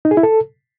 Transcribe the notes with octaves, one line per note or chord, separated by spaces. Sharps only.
D#4
G#4
E4
A4